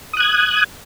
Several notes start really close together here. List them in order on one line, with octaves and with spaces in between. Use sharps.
D#6 F#6 G#6